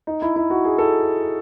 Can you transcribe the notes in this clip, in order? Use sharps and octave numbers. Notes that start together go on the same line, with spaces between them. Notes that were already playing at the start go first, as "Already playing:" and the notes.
D#4
E4
E4
F#4
G#4
A4